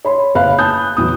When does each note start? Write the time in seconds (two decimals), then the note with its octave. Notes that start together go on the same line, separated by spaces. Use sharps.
0.05 C#5 B5 C6
0.35 F#1 B4 C#5 F5 B5 F#6
0.59 G#5 A5 B5 D#6 F#6 G6
0.97 E2 F#3 D#6